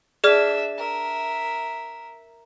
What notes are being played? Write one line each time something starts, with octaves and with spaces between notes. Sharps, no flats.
D4 G#4 D5 E5 F6
A#4 E5